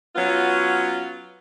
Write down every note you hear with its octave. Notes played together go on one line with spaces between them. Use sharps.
F#3 B3 C#4 F4